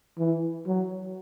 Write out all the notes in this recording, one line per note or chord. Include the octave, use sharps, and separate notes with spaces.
E3
F#3